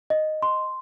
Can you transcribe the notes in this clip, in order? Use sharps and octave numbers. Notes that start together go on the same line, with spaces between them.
D#5
C6